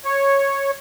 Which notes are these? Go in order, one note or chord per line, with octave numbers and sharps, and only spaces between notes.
C#5